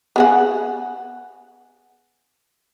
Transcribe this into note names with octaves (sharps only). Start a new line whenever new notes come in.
B3 G#4 F#5